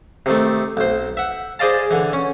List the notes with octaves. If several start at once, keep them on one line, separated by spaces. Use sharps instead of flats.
C3 D#3 A3
B1 C5
E5 F#5
G#4 C5 D5 D#5 F5 A5
D3 E3
C#4